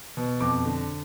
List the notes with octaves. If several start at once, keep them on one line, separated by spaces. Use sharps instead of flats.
B2
F2 D6
D3